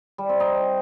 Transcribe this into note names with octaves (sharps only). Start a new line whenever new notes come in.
G3
C4
D#4